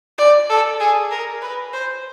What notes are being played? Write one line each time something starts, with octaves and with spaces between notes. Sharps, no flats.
D5
A4
G#4
A#4
B4
C5